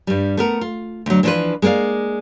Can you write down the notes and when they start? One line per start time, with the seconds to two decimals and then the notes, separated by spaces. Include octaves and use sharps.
0.07 G2 G3
0.37 A3 B3 A#4
0.61 F4
1.06 D2 F#3
1.23 E3 F3 D4 D#4 F4 B4
1.62 G#3 A#3 E4 D5 F5